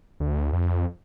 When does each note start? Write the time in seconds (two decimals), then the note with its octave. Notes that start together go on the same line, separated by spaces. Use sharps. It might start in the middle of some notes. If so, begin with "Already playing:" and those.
0.20 D2
0.53 F2